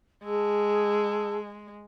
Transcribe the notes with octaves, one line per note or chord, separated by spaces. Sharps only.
G#3 G#4 A5 E6